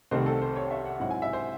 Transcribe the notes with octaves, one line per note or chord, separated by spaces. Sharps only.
C2 C3 D#3 A3 C4 C5
A4
C5
C#5
E5
F#5
G#2 F#3 C4 E4 F#5
G#5
E5
C5